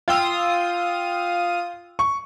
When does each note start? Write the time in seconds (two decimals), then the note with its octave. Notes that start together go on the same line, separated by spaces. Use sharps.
0.08 F4 F5 G5 D#6 E6
1.99 C#6